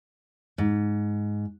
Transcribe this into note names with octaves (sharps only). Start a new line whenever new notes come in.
G#2